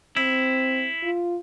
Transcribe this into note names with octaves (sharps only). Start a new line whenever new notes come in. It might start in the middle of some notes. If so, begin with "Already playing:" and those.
C4 E4
F4